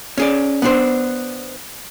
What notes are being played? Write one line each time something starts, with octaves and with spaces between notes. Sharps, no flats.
C#4 G#4 D5
B3 D4 C5